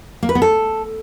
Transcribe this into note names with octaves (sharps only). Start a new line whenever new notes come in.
A#3
B4
B3
A4